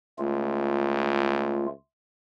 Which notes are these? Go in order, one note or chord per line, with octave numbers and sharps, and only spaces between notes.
C#2 A3 F4